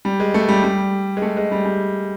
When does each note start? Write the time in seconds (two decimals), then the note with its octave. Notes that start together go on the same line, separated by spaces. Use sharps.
0.05 G3
0.20 G#3
0.34 A3
0.49 G3
0.64 G3
1.17 G#3
1.22 A3
1.37 G#3
1.52 G3
1.65 G3